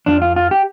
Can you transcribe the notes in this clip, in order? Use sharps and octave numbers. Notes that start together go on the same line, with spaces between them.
F2 D3 F3 D4
F4
F4
G4